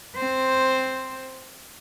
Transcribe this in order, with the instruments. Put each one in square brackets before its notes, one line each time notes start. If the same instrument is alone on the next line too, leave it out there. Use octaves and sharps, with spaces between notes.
[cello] C4 C5